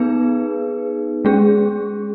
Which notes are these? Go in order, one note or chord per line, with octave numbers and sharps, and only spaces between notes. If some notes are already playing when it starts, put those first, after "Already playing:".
Already playing: B3 D#4 G#4 B4
G#3 C#4 G#4